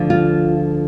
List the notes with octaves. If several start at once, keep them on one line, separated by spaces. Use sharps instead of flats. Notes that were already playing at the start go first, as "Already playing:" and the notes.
Already playing: D2 D3 F3
F4